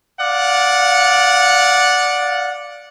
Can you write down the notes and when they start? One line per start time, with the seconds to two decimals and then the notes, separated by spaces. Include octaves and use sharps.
0.21 D5 F5 F#5